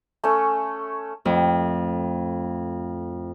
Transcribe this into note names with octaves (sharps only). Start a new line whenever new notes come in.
A3 C#4
F2 A2